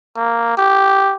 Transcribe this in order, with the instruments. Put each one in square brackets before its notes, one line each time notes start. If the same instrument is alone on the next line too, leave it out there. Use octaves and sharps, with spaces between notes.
[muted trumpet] A#3
G4